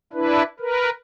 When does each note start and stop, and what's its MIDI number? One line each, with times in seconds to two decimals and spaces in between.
0.13 0.43 62
0.13 0.43 64
0.13 0.43 71
0.59 0.90 70
0.59 0.90 71